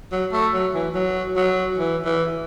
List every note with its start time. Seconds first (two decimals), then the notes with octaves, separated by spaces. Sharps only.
0.12 F#3
0.32 A3
0.53 F#3
0.74 E3
0.94 F#3
1.36 F#3
1.77 E3
2.05 E3